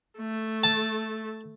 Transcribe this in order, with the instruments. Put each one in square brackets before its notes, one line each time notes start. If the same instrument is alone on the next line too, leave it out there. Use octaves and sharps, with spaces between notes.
[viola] A3
[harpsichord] A5